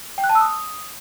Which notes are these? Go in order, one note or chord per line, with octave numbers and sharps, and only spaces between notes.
G5
F#6
A5
E6
D#6